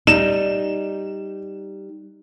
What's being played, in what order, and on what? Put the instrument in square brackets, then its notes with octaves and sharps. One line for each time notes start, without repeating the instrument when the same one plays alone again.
[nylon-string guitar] G3 D#4 [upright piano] E7